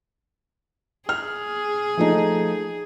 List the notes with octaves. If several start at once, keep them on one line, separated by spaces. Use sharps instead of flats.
G#4 F6
F3 A3 D#4